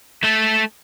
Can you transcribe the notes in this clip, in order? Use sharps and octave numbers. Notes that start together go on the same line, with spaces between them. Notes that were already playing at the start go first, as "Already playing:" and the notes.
A3 A4